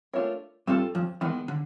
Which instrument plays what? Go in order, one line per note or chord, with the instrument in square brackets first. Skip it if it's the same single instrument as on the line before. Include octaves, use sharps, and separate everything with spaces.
[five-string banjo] A3 D4 F4 A#4 C#5
[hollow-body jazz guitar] G2 G3 [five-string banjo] C4 F4 A4
[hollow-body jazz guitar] F2 F3
[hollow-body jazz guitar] E2 E3 [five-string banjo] D#3 G#3 B3
[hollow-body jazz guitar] D3